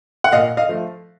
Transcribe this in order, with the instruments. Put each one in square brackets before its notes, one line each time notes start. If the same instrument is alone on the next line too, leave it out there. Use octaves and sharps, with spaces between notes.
[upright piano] F#5
A#2 D#5 F5
D#5 F5
F3 A3